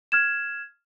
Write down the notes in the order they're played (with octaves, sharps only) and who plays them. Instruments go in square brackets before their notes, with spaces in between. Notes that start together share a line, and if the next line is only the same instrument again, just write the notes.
[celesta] F6 G#6 E7